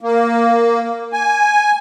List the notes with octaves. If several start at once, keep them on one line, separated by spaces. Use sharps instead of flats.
A#3
G#5